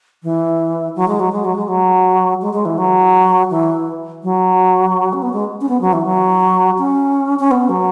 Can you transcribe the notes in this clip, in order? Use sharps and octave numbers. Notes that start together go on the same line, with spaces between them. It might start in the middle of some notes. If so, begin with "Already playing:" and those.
E3
F#3
G#3
F#3
G#3
F#3
G#3
F#3
G#3
G#3
E3
F#3
E3
F#3
C#4
B3
G#3
C#4
B3
F#3
E3
F#3
C#4
C#4
B3
F#3